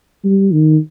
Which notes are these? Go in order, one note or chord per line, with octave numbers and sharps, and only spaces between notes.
G3
D#3